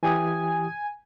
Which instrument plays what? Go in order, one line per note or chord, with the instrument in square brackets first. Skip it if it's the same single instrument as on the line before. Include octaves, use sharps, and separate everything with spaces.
[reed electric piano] E3 G4 D#6 [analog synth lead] G#5